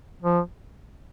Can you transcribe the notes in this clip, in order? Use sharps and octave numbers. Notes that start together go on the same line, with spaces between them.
F3